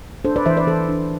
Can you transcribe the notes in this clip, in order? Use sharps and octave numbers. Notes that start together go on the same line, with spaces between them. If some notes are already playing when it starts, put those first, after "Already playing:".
D4 A4 C5
B4 D5
E3 C5 E5
B4 D5
E3 A4 C5
D4